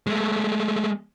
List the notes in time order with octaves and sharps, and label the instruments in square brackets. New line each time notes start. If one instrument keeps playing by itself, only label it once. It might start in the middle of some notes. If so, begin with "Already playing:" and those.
[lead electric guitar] G#3 A3